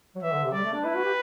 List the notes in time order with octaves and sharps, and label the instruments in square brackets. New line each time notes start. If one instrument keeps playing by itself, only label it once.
[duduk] F#3
[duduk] E3 [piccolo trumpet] E5
[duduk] D3
C3
[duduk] G3 [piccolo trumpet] D5
[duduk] A3
D4
[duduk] E4 [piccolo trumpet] B4
[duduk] F#4
G4